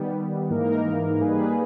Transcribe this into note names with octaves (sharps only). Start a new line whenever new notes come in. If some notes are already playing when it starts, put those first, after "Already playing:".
Already playing: D#3 G3 B3
G#2 E3 A#3 D#4 A#4
G3 A#3 D#4 G#4 B4